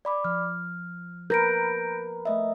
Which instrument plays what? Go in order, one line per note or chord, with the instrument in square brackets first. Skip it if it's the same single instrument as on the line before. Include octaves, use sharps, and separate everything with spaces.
[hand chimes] D5 B5 D6
[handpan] F3 [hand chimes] F6
[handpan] A#4 B4 [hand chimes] G6 A#6 D7
[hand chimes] A3 D#5 E5